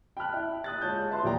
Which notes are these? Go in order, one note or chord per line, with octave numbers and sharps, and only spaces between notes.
G5 A5 B5 F6 F#6
E4
D#6 F#6 A6
G#3 F4 C#5 A5 G6
B4 E5 A5 C6
D#1 F3 A#3 D5 G5 A#5